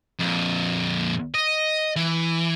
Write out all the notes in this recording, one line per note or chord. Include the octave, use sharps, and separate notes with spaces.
F2 A#2
D#5
E3